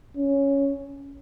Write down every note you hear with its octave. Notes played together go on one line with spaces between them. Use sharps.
C#4